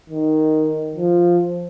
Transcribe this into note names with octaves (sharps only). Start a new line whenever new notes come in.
D#3
F3